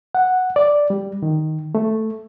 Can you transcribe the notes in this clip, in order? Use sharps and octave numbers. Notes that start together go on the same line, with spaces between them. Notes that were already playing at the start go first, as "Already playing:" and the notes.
F#5
D5
G3
D#3
A3